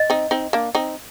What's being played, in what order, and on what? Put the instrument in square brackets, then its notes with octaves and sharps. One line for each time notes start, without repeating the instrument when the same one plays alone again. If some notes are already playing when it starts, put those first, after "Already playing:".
Already playing: [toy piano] D#5
[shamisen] C4 D#4
C4 D#4
A#3 D4
C4 D#4